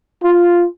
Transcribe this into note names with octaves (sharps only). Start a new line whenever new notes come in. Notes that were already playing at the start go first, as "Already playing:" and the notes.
F4